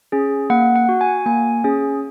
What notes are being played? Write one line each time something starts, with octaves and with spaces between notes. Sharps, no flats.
C#4 G#4
A#3 F#5
F#5
F#4
G#5
A#3 G#5
C#4 G#4